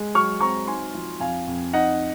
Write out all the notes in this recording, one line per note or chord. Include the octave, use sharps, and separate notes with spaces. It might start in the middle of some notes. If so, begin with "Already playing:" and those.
Already playing: G#3
F#3 C#6 F6
C4 A#5 C#6
D#4 G#5 C6
F3
F2 F5 G#5
F2
D#4 D#5 F#5